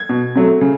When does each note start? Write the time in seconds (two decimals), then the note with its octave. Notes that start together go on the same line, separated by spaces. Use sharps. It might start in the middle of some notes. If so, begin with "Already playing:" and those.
Already playing: G#6
0.09 B2
0.35 F#3 A3 C4
0.61 C#3